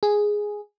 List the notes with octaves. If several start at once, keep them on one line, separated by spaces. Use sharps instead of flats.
G#4